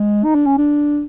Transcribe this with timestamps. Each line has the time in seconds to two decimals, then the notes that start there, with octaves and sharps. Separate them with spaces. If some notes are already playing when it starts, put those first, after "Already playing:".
Already playing: G#3
0.24 D#4
0.35 D4
0.46 C#4
0.57 D4